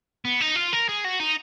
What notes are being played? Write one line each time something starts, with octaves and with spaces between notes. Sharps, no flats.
B3
D#4
F4
A#4
G#4
F#4
D#4